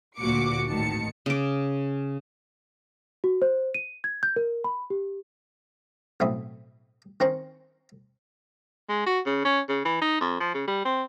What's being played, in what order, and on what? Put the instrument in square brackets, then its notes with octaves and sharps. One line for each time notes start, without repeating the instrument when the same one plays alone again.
[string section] D2 A#2 F#4 D6 C#7
G#1 A2 D#3 A5 C#7
[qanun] C#3 D6
[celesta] F#4
C5
D#7
G#6
G6
A#4
B5
G4
[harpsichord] B1 A2 C4 E5 B5 D#6
D#3 C4 C#4 C5 A#5 C6
[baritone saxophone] G#3
F#4
C#3
C#4
C#3
E3
D#4
F2
F3
C#3
G3
C4